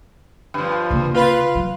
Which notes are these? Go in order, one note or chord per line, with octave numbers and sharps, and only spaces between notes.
G2 F3
C#3 A#3
F4 B4 F5
F#3